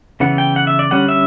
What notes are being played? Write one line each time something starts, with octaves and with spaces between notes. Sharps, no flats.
C#3 E3 B3 F#5
G5
F#5
E5
D5
D3 G3 C#4 F#5
E5